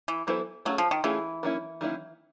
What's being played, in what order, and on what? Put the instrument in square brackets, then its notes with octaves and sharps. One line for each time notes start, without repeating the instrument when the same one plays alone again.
[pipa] E3
[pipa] E3 [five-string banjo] F#3 B3 E4 A4 C5
[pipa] F#3 [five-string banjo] A3 C#4 F4 G#4
[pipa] F3
D#3
[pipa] E3 [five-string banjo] A3 C#4 F4 G#4
[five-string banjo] D#3 F#3 A#3 C#4 E4
D#3 F#3 A#3 C#4 E4